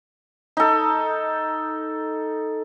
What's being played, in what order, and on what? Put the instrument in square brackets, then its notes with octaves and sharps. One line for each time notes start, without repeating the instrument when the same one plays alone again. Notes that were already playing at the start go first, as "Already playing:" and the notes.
[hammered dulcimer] D#4 A4